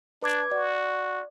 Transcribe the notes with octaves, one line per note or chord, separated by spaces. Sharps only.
D4 B4 D6 G#6
F#4 D5